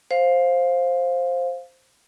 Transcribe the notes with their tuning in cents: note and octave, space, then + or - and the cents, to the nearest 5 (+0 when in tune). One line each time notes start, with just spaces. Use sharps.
C5 +10 F5 +10